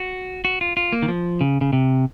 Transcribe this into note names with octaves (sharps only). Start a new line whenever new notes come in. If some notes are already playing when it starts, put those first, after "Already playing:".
Already playing: F#4
F#4
F4
F4
A#3
D#3
F3
C#3
C#3
C3